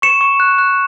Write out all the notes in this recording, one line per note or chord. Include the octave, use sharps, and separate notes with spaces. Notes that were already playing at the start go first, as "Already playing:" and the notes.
C#6 C#7 E7
C#6
F#6
F#6